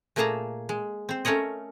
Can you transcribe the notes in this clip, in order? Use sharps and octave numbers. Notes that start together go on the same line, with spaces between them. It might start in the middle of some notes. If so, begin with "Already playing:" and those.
A#2 A3 A#3 G#4 A5 A#5
G#3
C4 C5
A3 C#4 A#4 C#5 D#5